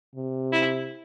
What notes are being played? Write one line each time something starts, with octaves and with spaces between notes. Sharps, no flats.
C3
E4